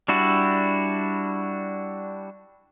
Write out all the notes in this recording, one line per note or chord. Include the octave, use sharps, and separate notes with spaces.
G3 D4 E4 F#4